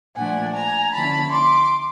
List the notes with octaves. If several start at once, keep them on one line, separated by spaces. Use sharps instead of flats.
A#2 F3 A3 D4 F#5 G#5
G#5 A#5
D3 F3 A#3 C#4 E4 A5 B5
C6 D6